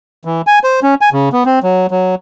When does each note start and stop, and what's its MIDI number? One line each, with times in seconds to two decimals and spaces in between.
0.25 0.42 52
0.47 0.59 80
0.64 0.80 72
0.83 0.95 61
1.01 1.09 80
1.13 1.29 49
1.32 1.44 59
1.46 1.59 60
1.63 1.87 54
1.91 2.15 54